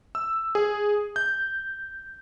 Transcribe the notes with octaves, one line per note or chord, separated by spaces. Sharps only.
E6
G#4
G6